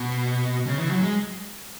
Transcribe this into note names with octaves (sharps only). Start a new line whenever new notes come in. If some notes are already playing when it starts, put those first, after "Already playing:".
Already playing: B2
C#3
E3
F#3
G#3